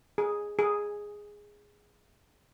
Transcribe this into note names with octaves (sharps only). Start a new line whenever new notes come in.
G#4
G#4